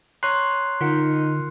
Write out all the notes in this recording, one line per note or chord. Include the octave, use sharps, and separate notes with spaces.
C#5 A#5 C6 C#6 F#6 C7
D3 D#4 F4 A#4 F#5